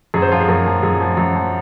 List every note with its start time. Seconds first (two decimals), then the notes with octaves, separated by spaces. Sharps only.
0.14 F#2 G#4
0.22 C5
0.31 F3 F4
0.40 G#4
0.49 F#2 A#4
0.66 F3
0.83 F#2 G#4
1.01 F3
1.17 F#2
1.35 F3